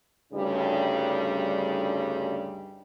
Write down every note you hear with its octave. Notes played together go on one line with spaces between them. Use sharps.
D2 G2 C#3 G3 D#4